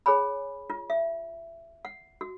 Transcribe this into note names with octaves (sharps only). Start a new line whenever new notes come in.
G#4 C#5 G#5 B5
F4
E5
F#5
F#4